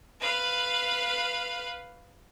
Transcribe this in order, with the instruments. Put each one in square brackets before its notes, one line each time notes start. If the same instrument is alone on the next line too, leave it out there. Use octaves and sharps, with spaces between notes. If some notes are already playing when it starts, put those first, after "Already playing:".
[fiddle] B4 F5